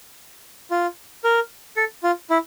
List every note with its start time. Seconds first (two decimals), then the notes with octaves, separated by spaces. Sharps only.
0.71 F4
1.24 A#4
1.77 A4
2.03 F4
2.30 E4